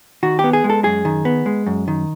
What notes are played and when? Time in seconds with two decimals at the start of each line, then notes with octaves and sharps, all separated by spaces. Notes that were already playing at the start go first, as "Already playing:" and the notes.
0.23 D#3 F#4
0.39 G4
0.44 B3
0.53 G#4
0.64 G#3
0.70 A4
0.84 F#2 G#4
1.05 D#3
1.25 B3
1.46 G#3
1.66 F#2
1.88 D#3